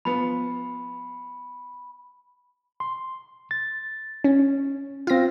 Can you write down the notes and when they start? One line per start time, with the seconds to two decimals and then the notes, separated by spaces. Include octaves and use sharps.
0.05 F3 B3 B5
2.80 C6
3.51 A6
4.24 C#4
5.07 C4 F4 F5 A#6